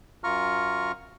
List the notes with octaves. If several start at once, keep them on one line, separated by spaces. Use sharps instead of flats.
F#2 F4 A#5 C#6 F6